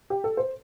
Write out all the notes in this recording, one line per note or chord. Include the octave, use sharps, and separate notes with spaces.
G4
A4
C5